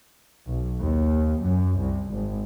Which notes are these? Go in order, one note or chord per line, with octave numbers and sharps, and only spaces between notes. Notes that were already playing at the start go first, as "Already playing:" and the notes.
B1
D#2
F#2
C2
G#1